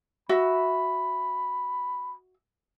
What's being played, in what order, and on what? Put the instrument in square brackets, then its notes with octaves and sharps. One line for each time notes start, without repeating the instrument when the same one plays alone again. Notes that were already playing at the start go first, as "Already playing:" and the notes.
[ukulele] F#4 E5 [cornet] B5